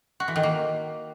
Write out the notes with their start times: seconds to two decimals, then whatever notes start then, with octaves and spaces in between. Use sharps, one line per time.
0.20 F#4
0.28 E3
0.36 D#3
0.43 A#3